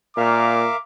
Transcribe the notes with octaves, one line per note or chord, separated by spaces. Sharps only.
A#2 A#4 E5 F5 D6